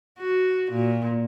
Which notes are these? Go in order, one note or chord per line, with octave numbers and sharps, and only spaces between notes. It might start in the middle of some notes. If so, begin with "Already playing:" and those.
F#4
A#2